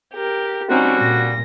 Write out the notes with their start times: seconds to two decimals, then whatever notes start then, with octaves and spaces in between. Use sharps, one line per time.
0.14 G4 A#4
0.70 D3 G3 C4 C#4 D#4 F#4
0.99 A#2 A#6